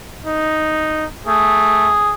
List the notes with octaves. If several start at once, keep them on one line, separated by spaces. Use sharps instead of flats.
D#4
A3 G#4